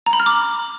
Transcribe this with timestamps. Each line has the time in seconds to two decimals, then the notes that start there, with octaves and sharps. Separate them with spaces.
0.06 A#5
0.13 B5
0.20 F6
0.26 D6